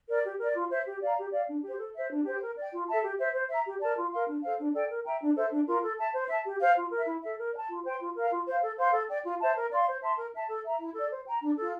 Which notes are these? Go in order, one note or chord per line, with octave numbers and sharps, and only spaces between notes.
A#4 D5
G4
A#4 D5
F4
C5 E5
G4
D5 F5 A#5
G4
D5 F5
D4
G4 C5
A4
C5 E5
D4
G4 C5 G5
A#4
D5 G5
F4
A4 E5 A5
G4
C5 E5
C5
E5 A#5
G4
A#4 D5 A5
F4
A#4 F5 C6
D4
A4 C5 F5
D4
A4 D5 G5
A#4
E5 G5 A#5
D4
A4 C5 E5
D4
F4 A#4
A4
E5 A5
C5
E5 A5
G4
C5 F5
F4
A#4
E5
E4
A4 E5
A#4
D5
A5
F4
C5 G5 C6
F4
A#4 F5
F4
C5 F5
A4
C5 F5 C6
A4
D5 G5
F4
C5 E5 A5
A#4
D5 F5 C6
C5
E5 A5 C6
A#4
E5 A5
A4
E5 A#5
E4
A4 D5
C5
G5 A#5
D4
F4 A4